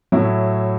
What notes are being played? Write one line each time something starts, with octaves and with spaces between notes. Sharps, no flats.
A2 F#3 E4